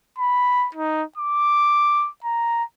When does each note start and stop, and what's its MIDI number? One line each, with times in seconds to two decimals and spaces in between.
0.18 0.68 83
0.75 1.03 63
1.17 2.09 86
2.24 2.63 82